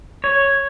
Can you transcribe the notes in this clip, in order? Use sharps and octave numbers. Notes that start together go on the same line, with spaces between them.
C#5